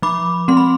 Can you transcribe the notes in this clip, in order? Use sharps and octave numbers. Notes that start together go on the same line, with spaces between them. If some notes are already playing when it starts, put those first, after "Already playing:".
F3 B5 D6
G#3 C4 C6
B5